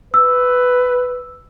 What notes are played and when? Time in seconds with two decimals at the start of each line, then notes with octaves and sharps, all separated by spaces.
0.14 B4 E6